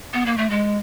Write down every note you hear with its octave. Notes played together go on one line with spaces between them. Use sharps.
B3
A#3
A3
G#3